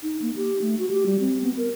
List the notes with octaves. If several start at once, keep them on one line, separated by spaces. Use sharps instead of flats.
D#4
A#3
G4
A3
F#4
G4
G3
C4
B3
A#4